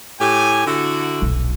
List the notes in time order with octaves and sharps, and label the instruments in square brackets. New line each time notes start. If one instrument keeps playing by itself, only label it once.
[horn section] A2 G4 G#5
D3 E4 F#4
[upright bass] D#1 B1